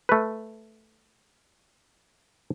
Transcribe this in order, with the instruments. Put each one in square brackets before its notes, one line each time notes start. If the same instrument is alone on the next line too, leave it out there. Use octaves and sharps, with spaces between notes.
[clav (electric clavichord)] A3 B4